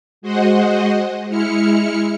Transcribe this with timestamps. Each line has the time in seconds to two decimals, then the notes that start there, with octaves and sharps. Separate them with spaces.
0.22 G#3 F#4 C5 D#5 F#5
1.29 G#3 E4 F6 C#7